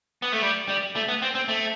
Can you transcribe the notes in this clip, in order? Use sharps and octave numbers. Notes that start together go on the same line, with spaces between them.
B3
A3
G3
G3
A3
B3
C4
C4
A3